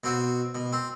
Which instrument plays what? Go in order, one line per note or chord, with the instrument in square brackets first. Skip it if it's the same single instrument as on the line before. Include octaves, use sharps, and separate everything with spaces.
[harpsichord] B2 C4 F#4
B2
C4